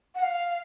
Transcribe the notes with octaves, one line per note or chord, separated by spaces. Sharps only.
F#5
F5